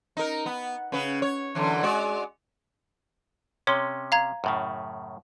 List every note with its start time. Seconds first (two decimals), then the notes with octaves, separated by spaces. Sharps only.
0.17 D#4 A#4
0.46 B3
0.92 C#3 B4
1.22 C#5
1.55 F#2 D3 E3
1.83 G#3 F#4 D5
3.67 C3 C#4 C#5 C6
4.12 F5 A#5 G#6
4.44 F#2 A2 C#3